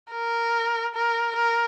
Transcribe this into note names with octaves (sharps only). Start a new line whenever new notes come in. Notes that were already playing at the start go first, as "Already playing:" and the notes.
A#4
A#4
A#4